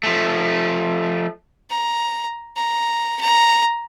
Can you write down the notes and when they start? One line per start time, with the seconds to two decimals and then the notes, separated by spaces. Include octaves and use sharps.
0.03 F3 A3
1.70 A#5
2.56 A#5
3.20 A#5